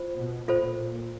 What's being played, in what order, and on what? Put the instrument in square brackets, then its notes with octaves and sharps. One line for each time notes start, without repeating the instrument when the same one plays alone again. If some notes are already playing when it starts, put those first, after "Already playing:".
Already playing: [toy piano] F4 C5
[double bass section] B2
[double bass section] A#2 [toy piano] F4 A4 C5